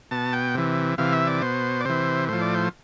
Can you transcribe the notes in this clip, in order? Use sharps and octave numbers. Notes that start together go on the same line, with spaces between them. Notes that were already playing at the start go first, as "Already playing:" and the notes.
B2 A5
G5
C3 E3
C3 E3 F5
E5
D5
B2 C5
D5
C3 E3 C5
A2 F3 C5
D5
C5